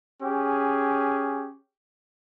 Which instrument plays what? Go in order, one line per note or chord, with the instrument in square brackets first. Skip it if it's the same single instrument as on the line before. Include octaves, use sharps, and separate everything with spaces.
[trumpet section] C#4 G4 G#4